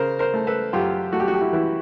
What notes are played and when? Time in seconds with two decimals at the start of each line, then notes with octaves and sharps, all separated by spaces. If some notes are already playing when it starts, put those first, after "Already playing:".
Already playing: C#3 A#4 C5
0.19 A#4 C5
0.34 A3
0.47 A4 B4
0.73 F#2 F4 G4
1.12 A3 F#4
1.20 G4
1.28 F#4
1.34 G4
1.41 E4 F#4
1.53 E3 E4